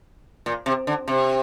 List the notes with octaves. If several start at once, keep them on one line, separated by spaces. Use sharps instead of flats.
A#2
C3
D3
C3